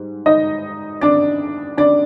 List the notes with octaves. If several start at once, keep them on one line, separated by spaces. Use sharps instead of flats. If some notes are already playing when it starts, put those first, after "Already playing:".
Already playing: G#2 G3
D#4 D#5
D4 D5
D4 D5